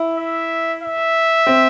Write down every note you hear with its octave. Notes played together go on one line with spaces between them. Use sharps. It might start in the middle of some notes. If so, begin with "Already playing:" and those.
Already playing: E4
E5
E5
C4